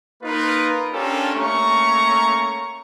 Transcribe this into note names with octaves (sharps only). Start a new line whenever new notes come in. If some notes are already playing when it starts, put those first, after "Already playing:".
A#3 D#4 F4 A#4 B4
C#4 D4 F4 G4 A4 A#4
A3 A#3 C#4 A#5 C#6